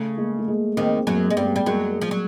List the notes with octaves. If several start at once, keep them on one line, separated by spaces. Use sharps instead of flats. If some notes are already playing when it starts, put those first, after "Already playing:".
Already playing: C#3 A3
G#3 A#3
A3
G#3 A#3
D#2 D#3 A#3 C4
F#2 F#3 G#3 A#3
G#3
G2 G3 A3 B3
G3
F#2 F#3 G#3 A#3
F3
F#3